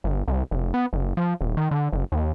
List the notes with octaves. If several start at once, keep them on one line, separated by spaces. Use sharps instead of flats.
G1
C2
F1
B3
F#1
F3
D#1
D#3
D3
F#1
D#2